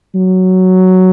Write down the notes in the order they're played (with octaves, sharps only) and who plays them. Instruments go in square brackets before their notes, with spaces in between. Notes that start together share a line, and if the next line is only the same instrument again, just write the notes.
[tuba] F#3